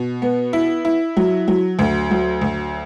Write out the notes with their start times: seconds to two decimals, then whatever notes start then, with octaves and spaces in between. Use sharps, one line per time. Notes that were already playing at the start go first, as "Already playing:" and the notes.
Already playing: B2
0.22 B3
0.53 E4
0.85 E4
1.17 F#3
1.48 F#3
1.79 D2
2.11 F#3
2.41 D2